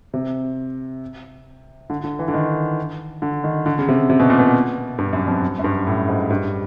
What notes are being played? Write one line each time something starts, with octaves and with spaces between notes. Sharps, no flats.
C3
D3
D3
E3
D3
D#3
D3
D#3
D3
C#3
C3
C3
B2
A#2
B2
G2
F#2
F2
F#2
G2
A2
G#2
G2